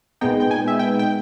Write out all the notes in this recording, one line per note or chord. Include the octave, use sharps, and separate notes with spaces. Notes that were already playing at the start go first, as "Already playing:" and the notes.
A#2 G#3 B3 D#4 G5
G5
G#5
E5
G5
G5